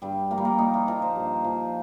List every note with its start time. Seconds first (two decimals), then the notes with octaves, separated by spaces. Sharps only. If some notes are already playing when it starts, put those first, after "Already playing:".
0.02 G2 G3
0.30 F3 A#3
0.38 G3
0.45 A#3
0.59 A#2 D#4
0.74 F4
0.88 F3 A#4
1.02 C5
1.16 G2
1.45 F3